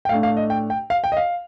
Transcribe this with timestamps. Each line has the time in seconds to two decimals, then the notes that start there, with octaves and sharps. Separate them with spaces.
0.05 G5
0.09 A2 A3 D4 F5
0.23 F5
0.37 D#5
0.50 G5
0.70 G5
0.90 F5
1.04 G5
1.12 D#5
1.17 F5